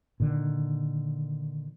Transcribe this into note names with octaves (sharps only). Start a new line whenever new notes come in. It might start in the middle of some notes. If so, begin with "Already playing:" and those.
A#2 D3 D#3